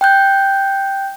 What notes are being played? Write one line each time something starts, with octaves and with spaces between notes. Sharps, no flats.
G5 F#6 G6